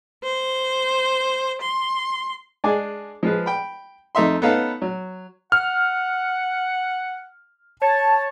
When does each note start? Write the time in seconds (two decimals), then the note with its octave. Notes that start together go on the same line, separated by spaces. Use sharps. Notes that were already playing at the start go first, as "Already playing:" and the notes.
0.24 C5
1.62 C6
2.64 G#3 D4 D5 G#5
3.23 F3 G#3 B4
3.46 G5 B5
4.15 F2 A3 D#4 E5 C6
4.42 B3 C#4 D#4 A4 B4 F5
4.82 F#3
5.52 F#5 F6
7.82 C#5 A5